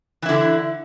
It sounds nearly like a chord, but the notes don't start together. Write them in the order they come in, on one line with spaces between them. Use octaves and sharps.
E3 E4 D3